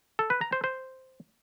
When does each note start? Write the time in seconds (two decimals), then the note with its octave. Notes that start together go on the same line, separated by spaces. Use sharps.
0.19 A4
0.30 B4
0.41 A#5
0.53 C5
0.64 C5